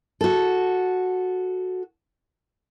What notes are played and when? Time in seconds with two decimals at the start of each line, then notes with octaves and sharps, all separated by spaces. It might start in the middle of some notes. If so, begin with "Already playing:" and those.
0.21 F#4 A4